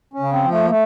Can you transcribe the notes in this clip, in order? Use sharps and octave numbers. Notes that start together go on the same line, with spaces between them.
C#4
C#3
C4
F3
A3
A#3
A3